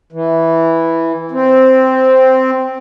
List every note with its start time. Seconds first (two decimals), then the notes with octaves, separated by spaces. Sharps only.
0.12 E3
1.32 C4